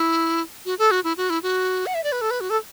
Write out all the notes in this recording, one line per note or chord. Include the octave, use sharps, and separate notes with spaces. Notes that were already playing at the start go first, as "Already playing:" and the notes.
Already playing: E4
F#4
A4
F#4
E4
F#4
E4
F#4
F#5
E5
D5
B4
A4
B4
F#4
A4